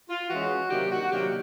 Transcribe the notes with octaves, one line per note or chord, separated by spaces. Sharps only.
F4
E3 G#3 C#4 F#4
C3 D#3 F#3 A#3 D4 G4
F#4
C3 D#3 F#3 A#3 D4 G4